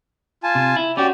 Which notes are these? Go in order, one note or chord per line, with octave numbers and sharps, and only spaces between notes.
F4 G#5 A5
C3
E4
C#4 F#4 G4 D5